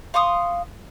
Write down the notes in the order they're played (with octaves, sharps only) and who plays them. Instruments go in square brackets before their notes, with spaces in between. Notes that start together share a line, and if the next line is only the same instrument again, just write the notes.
[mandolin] F5 C6 C#6 D#6